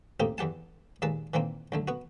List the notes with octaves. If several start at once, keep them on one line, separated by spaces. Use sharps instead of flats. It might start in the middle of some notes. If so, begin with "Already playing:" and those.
C#2 A2 A#3 C4 D#4 G4
E2 E3 G4 F#5 A5
D#2 A#2 G#3 B4 A5
A#2 D#3 E3 A#3 C4
B1 D3 A3
B3 F#4